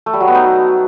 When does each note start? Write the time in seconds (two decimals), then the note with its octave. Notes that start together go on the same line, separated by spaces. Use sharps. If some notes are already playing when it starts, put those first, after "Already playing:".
0.06 A3
0.13 G3
0.21 F#3
0.28 B3
0.35 D#4